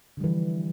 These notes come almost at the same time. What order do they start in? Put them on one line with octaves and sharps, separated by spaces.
D3 G3 E3 F3